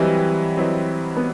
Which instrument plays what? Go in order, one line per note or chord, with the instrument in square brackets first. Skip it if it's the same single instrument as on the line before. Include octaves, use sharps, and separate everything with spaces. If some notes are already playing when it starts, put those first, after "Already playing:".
Already playing: [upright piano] E3 G3 [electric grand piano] F#3 C4 E4 B4 D#5
[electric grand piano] F#3 C4 E4 B4 D#5
[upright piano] B3